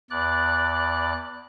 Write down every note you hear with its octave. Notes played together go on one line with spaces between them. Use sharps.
E2 D5 F#6